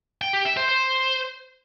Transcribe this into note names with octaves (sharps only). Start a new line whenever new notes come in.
G5
G4
E5
C5
C5